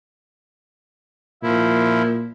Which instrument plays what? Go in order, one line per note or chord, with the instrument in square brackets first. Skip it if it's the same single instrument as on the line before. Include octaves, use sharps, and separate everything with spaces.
[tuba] A#2 [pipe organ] F3 E4